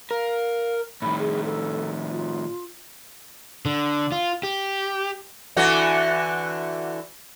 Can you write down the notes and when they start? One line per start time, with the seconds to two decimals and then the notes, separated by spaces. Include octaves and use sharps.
0.11 A#4 F5
1.02 A2 D#3 B5
1.18 G#4
1.44 A4
2.10 F4
3.65 D3
4.12 F4
4.43 G4
5.57 D3 E3 F#4